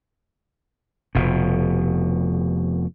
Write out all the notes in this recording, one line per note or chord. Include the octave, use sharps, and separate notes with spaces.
F1 B2